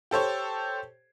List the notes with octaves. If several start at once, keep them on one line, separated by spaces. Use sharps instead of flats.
G4 A4 C5 C#5